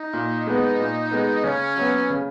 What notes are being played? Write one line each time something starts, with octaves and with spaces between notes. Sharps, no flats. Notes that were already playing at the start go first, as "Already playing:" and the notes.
Already playing: D#4
A#2
G#3 B3
A#2
G#3 B3
C#3 C#4
F#3 B3
C#3